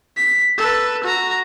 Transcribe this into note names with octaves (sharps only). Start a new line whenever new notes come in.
B6
A4 B4
F#4 A#5